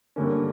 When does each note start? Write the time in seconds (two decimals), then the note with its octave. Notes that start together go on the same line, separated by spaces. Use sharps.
0.16 G2 D3 A#3 C#4